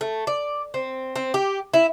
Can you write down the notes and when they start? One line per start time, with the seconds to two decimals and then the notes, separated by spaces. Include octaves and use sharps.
0.01 A3
0.27 D5
0.74 C4
1.16 C4
1.34 G4
1.74 E4